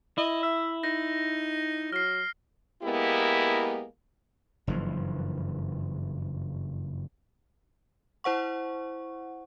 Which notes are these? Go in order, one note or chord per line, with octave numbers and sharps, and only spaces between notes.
E4 D#5
E5
D#4 A#6
F#3 F6 C7
G#3 A#3 B3 E4 G4 A#4
F#1 G2 E3 F3
E4 C5 F#5 C#6